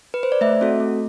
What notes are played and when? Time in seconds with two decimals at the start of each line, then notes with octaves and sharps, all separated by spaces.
0.14 B4
0.23 C5
0.32 D5
0.41 A3 E5
0.61 C4 F#4 A4
0.80 A3